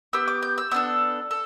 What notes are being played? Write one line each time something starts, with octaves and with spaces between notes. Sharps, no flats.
B3 G4 E6
D6
G6
E6
B3 D4 A4 E6
A4